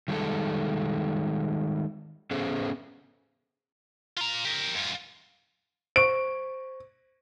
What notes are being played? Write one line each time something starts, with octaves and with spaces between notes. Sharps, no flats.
D#3 G3 G#3 A4
B3 C#4 G#4 A4 C5
F4 A#5
G4 A#4
F#2 F4
C5 C#6 D7